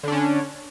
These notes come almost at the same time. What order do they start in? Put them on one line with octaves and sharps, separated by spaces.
D3 D4 C#4